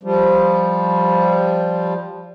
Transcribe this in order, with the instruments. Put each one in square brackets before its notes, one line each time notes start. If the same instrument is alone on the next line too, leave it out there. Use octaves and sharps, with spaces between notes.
[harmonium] F3 G3